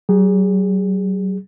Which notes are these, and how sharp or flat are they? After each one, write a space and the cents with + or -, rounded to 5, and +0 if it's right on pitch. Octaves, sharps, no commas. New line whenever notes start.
F#3 +40 G#4 -20